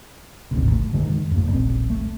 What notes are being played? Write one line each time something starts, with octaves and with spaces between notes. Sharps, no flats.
G#1 D2 C3
A3
F#2 D3 D#3 G#3
F#2 A3
D#1 A#1 C4
A3